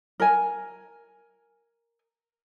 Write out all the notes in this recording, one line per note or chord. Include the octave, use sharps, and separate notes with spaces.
A#4 G#5